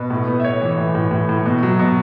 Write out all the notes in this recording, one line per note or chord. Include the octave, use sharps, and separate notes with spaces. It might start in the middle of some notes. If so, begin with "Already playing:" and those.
Already playing: B2 B4
A2
B3
E5
B3 C#5
E3
A2
A2
A2
A2
B2
F#3
B2